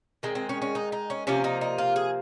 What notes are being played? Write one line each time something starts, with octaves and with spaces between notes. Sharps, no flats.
D#3 G#3 C4
C4
C#4
C#4
D#4
D#4
C#4
C3 F3 A#3 C#4
D#4
D#4
F4
G#4